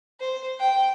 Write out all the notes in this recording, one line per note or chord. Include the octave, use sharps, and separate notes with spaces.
C5
G5